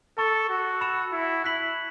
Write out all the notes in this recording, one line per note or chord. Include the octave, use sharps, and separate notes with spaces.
A4 A5 C#6 A6
F#4
B5 E6 C#7 E7
E4
E4 F#6 B6 F#7